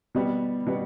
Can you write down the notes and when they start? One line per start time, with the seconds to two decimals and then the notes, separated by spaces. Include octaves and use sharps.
0.15 B2 G3 B3
0.67 B2 G3 B3